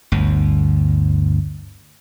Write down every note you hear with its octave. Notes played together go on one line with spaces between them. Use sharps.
G1 D2